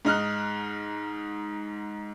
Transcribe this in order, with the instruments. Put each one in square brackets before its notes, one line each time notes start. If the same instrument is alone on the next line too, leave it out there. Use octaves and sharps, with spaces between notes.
[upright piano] G#2 D#4 F6 F#6